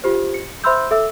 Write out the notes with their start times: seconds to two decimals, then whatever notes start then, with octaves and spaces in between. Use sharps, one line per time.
0.04 F4 G4 C5
0.34 C#7
0.64 C5 E5 B5 C6 E6 G6
0.91 A4 E5 E6